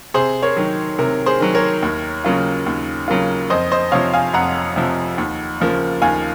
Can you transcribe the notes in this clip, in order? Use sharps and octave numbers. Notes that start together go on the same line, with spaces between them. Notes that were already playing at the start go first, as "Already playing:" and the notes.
C3 G#4 C5
A#4 C#5
D#3 F#3
C3 A#4
G#4 C5
D#3 F#3
A#4 C#5
D#2
C#3 F#3 A#3 F4
D#2
C#3 F#3 A#3 F4
F2 C5 D#5
C5 D#5
C3 F3 C#5 F5
F5 G#5
F2 F#5 A#5
C3 F3
D#2
C#3 F3 A#3
D#2 F5 G#5